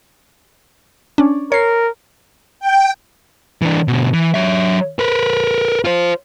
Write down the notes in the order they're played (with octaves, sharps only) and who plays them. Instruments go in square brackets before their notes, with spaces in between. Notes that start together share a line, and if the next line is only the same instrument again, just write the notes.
[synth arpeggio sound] C#4 D4
[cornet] A#4 [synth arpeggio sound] C#5 C7
[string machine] G5
[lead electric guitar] E3 D4
B2 D3
E3
F#3 E5
A#4 B4
F4 C5